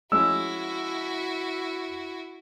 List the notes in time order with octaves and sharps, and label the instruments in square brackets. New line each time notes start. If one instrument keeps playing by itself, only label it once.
[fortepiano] F3 G#3 C#4 [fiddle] E4 F#4 [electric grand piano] E6